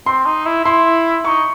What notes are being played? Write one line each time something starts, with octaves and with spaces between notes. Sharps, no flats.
C4 C6
D#4
E4
E4 C6
D#4 C#6